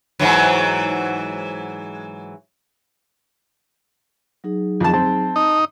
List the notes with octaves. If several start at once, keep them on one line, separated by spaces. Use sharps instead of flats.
G#2 E3 F#3
F#3 D#4 G#4
F2 D#3 A5
C4 A5
D#4